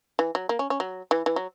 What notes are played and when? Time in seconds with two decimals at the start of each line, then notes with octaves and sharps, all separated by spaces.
0.19 E3
0.35 F#3
0.49 A#3
0.59 C#4
0.70 C#4
0.80 F#3
1.11 E3
1.26 E3
1.36 F#3